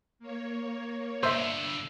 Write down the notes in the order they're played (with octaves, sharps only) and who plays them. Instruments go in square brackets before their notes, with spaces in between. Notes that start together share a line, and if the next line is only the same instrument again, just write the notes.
[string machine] A#3 C#5
[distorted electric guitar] G2 D3 [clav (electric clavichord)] C5 [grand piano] E5 E6